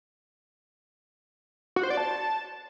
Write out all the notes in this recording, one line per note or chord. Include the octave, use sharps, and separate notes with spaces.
F#4
C5
D5
A5